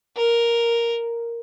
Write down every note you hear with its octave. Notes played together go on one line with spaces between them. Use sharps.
A#4